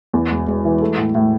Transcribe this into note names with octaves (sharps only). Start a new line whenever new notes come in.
E2
E1
E1
E3
A3
A2
A2